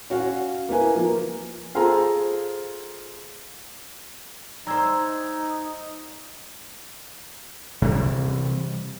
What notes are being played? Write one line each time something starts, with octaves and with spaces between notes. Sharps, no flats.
C#4 F#4 C#5 F5 F#5
A#3 E4 B4 G#5
F3 A#3
F4 G#4 A4 C5 F5 A#5
G3 D#4 C5 A#5 E6 G#6
C3 E3 G3